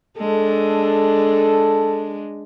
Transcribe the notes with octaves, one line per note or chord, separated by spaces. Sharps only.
G#3 D4 A4